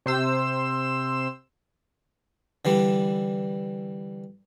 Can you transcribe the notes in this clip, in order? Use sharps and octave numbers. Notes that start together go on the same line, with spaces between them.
C3 C5 E6
D3 E3 G3